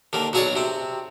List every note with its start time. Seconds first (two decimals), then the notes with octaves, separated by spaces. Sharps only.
0.13 D#2 D3 A#3
0.33 B1 F#3 F#4 G#4 C#5 D5
0.56 C3 C4